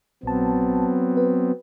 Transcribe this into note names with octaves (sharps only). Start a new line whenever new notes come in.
A#1 F#3 B3 C4 A5
B4